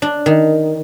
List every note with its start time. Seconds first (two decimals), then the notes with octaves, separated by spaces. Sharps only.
0.02 D4
0.26 D#3